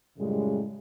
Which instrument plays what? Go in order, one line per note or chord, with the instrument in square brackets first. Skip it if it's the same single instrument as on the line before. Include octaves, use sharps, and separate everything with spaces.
[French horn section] F#2 A2 C#3 G3 G#3